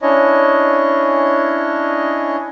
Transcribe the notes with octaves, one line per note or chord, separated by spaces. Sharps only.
C#4 D4 E4 C#5 D#5